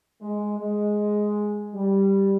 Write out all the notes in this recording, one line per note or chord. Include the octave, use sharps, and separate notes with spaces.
G#3
G#3
G3